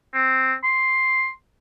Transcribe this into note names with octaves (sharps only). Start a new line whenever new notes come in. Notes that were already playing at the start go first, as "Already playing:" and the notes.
C4
C6